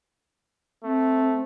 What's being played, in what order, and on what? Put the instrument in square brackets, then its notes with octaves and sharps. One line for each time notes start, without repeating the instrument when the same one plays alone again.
[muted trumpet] A3 [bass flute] C4